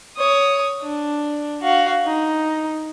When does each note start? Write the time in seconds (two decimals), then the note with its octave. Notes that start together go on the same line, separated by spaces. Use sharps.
0.17 C#5 D#6
0.82 D4
1.62 F#4 F5
2.06 D#4